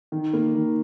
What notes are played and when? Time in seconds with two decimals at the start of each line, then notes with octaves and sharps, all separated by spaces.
0.12 D#3
0.33 A#3
0.55 D#3